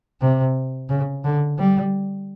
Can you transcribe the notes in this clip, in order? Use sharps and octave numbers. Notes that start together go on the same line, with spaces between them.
C3
C#3
D3
G3